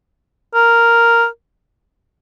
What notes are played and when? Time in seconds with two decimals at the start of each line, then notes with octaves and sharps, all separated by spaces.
0.54 A#4